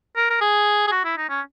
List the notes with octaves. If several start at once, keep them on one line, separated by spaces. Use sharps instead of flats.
A#4
A#4
G#4
G#4
F#4
E4
D#4
C#4